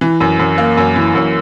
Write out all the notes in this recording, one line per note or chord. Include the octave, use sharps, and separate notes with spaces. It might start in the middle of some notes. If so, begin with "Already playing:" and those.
E3
F#2
F#2
A#3
F#2
E3
F#2